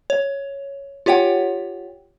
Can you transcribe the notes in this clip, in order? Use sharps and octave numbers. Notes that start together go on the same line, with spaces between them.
C#5
F4 G4 C#5 F#5 G5